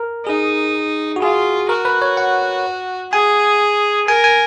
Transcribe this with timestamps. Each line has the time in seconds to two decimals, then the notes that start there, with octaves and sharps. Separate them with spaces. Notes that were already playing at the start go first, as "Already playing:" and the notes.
Already playing: A#4
0.26 D#4 G#4
1.16 F#4
1.22 F4 G#4
1.69 F#4 A#4
1.85 B4
2.02 C#5
2.17 F#5
3.12 G#4 G#5
4.07 A#4 G#5
4.24 G#5